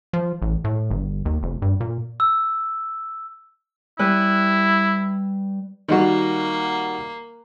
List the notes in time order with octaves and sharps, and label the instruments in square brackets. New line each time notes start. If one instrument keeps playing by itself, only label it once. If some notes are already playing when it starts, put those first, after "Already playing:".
[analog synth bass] F3
A1
A2
G1
D#2
F1
G2
A#2
[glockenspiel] E6
[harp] G3 B4 F#6 [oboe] E4
[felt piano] D#3 G3 F#4 [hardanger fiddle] A#3